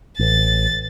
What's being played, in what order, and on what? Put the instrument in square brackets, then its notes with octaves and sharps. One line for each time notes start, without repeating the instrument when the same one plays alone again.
[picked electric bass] A1 [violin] A6